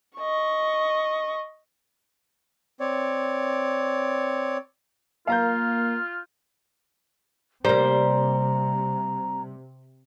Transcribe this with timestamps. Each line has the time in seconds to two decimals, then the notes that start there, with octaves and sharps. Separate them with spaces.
0.17 D#5 C#6
2.80 C4 C#5 D5
5.27 A#3 F4 F5 A#5 G6
7.65 C3 G3 A#3 C5 A#5